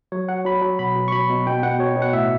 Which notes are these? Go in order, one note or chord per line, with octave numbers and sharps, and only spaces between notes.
F#3 C#5
F#3 F#5
F#3 B5
F#3
B2 B5
B2
C#6
F#3 B5
B2
B2 G5
B2 F#5
B2 C#5
B2
F#5
A2 E5